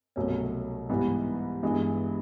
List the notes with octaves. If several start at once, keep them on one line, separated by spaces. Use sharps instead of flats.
C2 B2 F#3 A3 C#4
G#2 E3 G3 B3
G2 E3 G#3 B3